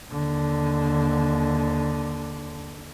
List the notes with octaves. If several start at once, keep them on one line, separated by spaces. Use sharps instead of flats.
D#2 D3